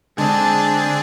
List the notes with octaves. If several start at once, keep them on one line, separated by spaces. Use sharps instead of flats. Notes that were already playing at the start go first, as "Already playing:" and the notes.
D3 G#3 C4 D4 G#4 A5